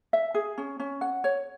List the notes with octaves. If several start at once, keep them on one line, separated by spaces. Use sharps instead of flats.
E5
G#4
C#4
C#4
F#5
C#5